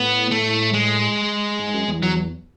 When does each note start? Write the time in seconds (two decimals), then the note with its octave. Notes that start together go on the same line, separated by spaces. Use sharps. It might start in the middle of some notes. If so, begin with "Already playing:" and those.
Already playing: A2 B3
0.31 A3
0.74 G#3
1.60 G#2
1.74 F#2
1.88 E2
2.03 F#3